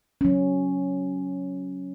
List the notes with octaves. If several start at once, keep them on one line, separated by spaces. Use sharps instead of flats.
F#3 C#4